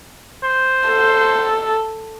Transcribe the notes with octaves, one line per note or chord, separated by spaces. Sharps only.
C5
A4